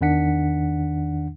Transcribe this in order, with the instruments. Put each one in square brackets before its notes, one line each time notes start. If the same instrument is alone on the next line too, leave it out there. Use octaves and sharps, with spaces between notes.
[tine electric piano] E2 D#3 D4 F#5 B6 C#7